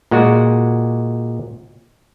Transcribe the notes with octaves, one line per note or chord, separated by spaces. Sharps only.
A#2 G#3 F#4